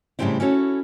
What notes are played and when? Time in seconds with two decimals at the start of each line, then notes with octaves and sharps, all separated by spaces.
0.19 A2 C#3 G3 A3 C4 E4
0.40 C#4 E4 F#4 A4 C#5